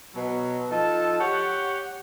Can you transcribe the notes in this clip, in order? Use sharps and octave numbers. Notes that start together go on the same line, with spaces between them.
B2 F#3
F3 D#4 A4 A5
G4 C#5 F#5